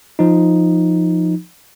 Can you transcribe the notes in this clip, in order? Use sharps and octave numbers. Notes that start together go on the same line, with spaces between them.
F3 D#4